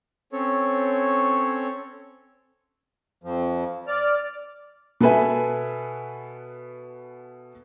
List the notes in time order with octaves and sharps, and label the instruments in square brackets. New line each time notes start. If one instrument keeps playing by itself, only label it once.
[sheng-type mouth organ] C4 C#4 A4 C#5
[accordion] F2 F3
D5 F6
[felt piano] B2 B3 A4 B4 E5 G#5